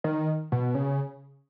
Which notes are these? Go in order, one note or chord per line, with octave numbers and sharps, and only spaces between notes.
D#3
B2
C#3